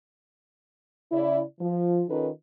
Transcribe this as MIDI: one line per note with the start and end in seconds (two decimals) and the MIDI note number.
1.11 1.41 49
1.11 1.41 64
1.11 1.41 74
1.60 2.03 53
2.08 2.28 51
2.08 2.28 61
2.08 2.28 63
2.08 2.28 65
2.08 2.28 69
2.08 2.28 71